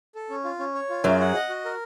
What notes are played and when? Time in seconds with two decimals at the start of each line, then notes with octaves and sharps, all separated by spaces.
0.15 A4
0.30 C#4
0.44 F4
0.59 C#4
0.74 C#5
0.90 F4
1.04 F#2 F#3 G#4
1.20 F#5
1.35 D#5
1.49 F#4
1.65 A#4